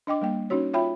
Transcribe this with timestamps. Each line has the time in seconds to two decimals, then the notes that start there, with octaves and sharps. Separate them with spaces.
0.07 D4 D#5 G5 D6
0.21 G3 A#3 G5
0.50 C#4 D#4 F#4 C#5
0.73 F4 C#5 E5 G5 B5